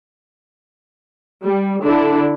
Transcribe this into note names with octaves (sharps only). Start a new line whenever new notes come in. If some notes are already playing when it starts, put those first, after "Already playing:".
G3
D3 D4 E4